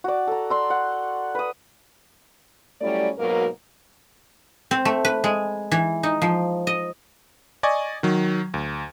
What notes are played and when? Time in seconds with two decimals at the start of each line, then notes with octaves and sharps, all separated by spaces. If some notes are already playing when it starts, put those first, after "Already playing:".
0.04 F#4 D5
0.28 A4 A#5
0.50 D5 C6 E6
0.70 F#5
1.35 B4 D#6
2.81 F#3 G3 A3 C#4 E4 D5
3.18 G#2 B2 F#3 A#3 A#4
4.71 C4
4.85 A3
5.05 B4
5.24 G#3
5.71 E3
6.03 D#4
6.22 F3
6.67 D#5
7.63 D5 D#5 G#5 C#6 G#6
8.03 D#3 F#3
8.54 D2